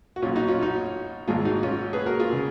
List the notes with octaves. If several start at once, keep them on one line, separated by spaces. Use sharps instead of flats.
F#4
B1 A#2 C#4 F4
D#4 F#4
C#4 F4
D#4 F#4
G#1 G#2 D#3 F4 G#4
D#4 F#4
C#4 F4
G#4 B4
F#4 A#4
F4 G#4
C#3